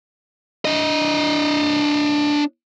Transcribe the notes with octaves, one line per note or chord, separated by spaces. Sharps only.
D4 D#5